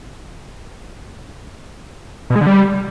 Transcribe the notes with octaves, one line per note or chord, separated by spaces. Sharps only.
B2
G#3
D3
G3